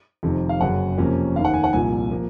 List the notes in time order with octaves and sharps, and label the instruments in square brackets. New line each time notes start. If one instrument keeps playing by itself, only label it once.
[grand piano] F1 F2 C3 D#3
F5
F#1 F#2 C#3 F#5
F2 C3 F3 A#3 C#4
F1 D#2 D#3 F5
F#5
G#5
F#5
C2 A#2 F3 G#5
F3 A#3